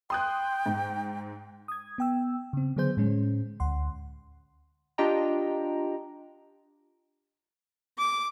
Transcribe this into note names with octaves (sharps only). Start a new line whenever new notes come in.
G5 C6 D#6 F#6
G#2
D#6 G#6
B3 G5 E6
C#3 C4
D3 F#3 B3 G#4 C5 G6
A2 G#3 C#4
D2 F#5 C6
D4 F4 G4 D#5 G5 A#5
D6